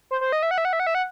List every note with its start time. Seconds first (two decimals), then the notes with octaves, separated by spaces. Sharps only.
0.11 C5
0.21 C5
0.32 D#5
0.43 E5
0.51 F#5
0.58 E5
0.65 F#5
0.73 E5
0.80 F#5
0.87 E5
0.95 F#5